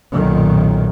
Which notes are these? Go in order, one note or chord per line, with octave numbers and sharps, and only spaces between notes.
B1 F#2 A#2 D#3